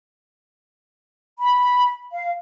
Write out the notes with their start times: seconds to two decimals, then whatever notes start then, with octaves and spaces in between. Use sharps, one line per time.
1.39 B5
2.12 F5